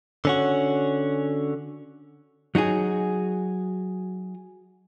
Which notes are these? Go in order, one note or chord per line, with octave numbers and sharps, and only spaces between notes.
D3 C#4 F#4
F#3 D#4 F#4 G#4